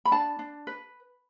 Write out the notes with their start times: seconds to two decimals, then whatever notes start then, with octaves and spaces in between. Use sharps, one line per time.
0.05 B5
0.11 D4 A5
0.39 D4
0.67 B4